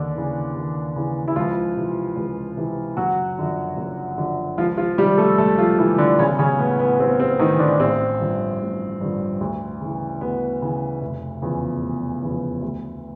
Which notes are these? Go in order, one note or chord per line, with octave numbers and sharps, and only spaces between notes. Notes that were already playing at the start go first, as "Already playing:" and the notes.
Already playing: D#2 D3 D4
C#3 E3
D#2
C#3 E3
E4
C#2 F3 F4
C3 E3
C#2
C3 E3
F#1 F#3 F#4
F#2 D3 F3
F#1
F#2 D3 F3
C#2 F3 F4
F3 F4
C3 D#3 G3 G4
A3 A4
C#2 A3 A4
F3 F4
C3 D#3 E3 E4
D3 D4
B1 C#3 C#4
C#3 C#4
A2 E3 B3
B3
B1 C4
C4
A2 D#3 E3 D#4
D3 D4
A1 C4
G2 D3 F3
A1
G2 D3 F3
D2
C#3 E3
D2 B3
C#3 E3
F1
E2 C#3 F3
F1
E2 C#3 F3
D2